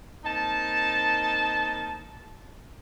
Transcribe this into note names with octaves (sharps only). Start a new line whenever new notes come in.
A#3 C4 D#4 A5